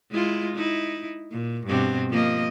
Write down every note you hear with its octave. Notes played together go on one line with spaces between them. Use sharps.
G#3 E4 F4
D#4 E4
A#2
G2 B2 C4
F3 A#3 D#5